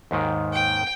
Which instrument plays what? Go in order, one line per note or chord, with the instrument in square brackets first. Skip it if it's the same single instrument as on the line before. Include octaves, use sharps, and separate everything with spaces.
[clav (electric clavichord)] D#2 G#2 D#3
[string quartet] G5